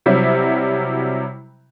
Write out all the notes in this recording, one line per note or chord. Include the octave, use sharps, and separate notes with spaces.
C3 F#3 G3 E4